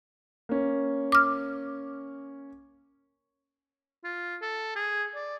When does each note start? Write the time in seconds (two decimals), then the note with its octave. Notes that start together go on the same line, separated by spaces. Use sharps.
0.49 A#3 C#4
1.12 D6 F6
4.04 F4
4.42 A4
4.76 G#4
5.15 D5